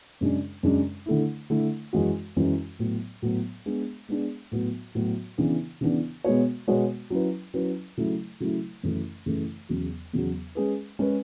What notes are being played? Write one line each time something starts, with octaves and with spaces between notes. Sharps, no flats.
F#2 C#3 G#3 D4
F#2 C#3 G#3 D4
D3 A3 E4
D3 A3 E4
F#2 E3 G#3 C#4 F#4
F#2 E3 G#3 C#4 F#4
A2 F#3 B3
A2 F#3 B3
G#3 B3 D4 G#4
G#3 B3 D4 G#4
A2 F#3 B3 F#4
A2 F#3 B3 F#4
C#3 E3 B3 D4
C#3 E3 B3 D4
B2 G#3 B3 F#4 C#5
B2 G#3 B3 F#4 C#5
F#3 C#4 E4 B4
F#3 C#4 E4 B4
C#3 F#3 A3 E4
C#3 F#3 A3 E4
F#2 C#3 E3 A3
F#2 C#3 E3 A3
E2 C#3 F#3
E2 C#3 F#3
G#3 C#4 G#4 B4
G#3 C#4 G#4 B4